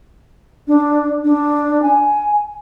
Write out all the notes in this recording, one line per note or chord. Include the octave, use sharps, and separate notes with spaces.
D4
D4
G#5